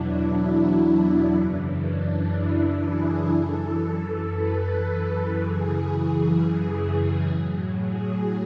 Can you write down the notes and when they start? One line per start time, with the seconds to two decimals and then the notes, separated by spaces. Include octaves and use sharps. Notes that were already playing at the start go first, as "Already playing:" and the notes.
Already playing: E2 B2 F#3 D4 E4
0.34 E4
1.34 F#2 C#3 E3
1.84 D4
2.33 E4
2.82 G#4
3.32 F#2 E3 A4
4.31 B4
5.30 F#2 C#3 E3 G#4
6.29 G#4
7.28 A2 F#3
7.78 G#4